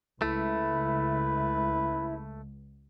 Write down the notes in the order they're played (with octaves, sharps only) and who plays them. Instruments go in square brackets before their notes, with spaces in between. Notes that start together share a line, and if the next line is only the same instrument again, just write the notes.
[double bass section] C#2 [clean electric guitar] A3 [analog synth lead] E4 [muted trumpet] B4